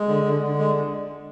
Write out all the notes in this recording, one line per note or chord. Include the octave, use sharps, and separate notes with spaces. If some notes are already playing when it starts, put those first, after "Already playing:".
Already playing: G#3
D3
D3
D3
G#3